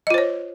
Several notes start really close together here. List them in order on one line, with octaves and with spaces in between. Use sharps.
D#5 F4 C5 C#5